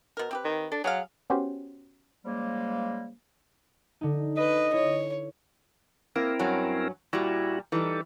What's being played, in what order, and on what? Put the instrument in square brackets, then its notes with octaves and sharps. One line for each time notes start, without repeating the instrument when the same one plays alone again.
[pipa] B2 A#4
C4 G4 B4
[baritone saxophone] D#3
[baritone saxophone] D4 [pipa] A4
[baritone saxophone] F#3 [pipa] G#4 C#5 F5
[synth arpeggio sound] B3 C#4 F#4 G4 C5
[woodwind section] C#3 F3 G3 G#3 A#3
[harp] D3 D#4
[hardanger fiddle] B4 [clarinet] D#5
[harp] E4 [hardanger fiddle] C#5
[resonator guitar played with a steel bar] A#3 [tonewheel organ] C4 E4 A#4
[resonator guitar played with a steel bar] G2 F#3 C#4
[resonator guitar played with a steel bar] A#2 G3 [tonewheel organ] E4 F#4
[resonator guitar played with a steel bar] E3 G3 [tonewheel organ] D#4 A4